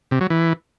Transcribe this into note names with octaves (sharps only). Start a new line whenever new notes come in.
C3
F#3
E3